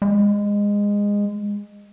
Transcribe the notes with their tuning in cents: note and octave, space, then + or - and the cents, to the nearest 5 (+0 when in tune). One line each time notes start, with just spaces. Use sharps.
G#3 -20